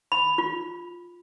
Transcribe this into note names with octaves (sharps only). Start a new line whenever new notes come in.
B5
F4